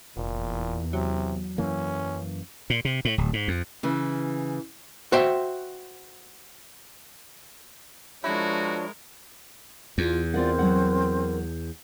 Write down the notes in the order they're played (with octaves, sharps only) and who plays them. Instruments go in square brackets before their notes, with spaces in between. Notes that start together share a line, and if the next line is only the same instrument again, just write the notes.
[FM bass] F1 [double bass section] E2 [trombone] A#2
[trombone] C3 [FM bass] F#3
[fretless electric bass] F#2 E3 A#3 [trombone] C#4
[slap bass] A#2
C3
A2
D1
G#2
F2
[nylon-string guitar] C#3 E3
[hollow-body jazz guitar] F#4 C5 E5 G5
[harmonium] F3 D4 C#5 [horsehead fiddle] G#3 A#4 [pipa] E4 [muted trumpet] F#4
[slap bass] E2 [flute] F4
[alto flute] C4 [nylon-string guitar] F4 D5 F#5 [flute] A#4
[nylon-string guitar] F#3 F#5